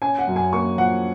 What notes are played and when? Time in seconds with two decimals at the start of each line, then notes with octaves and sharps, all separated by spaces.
0.02 C#4 G#5
0.19 F#5
0.28 F#2
0.36 G#5
0.53 A#3 C#6
0.78 F3 F#5